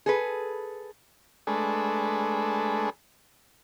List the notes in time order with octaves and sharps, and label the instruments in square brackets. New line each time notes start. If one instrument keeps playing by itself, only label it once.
[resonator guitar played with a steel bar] G#4 A4 B4
[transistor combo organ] G#3 A3 D4 G#4 A4 B4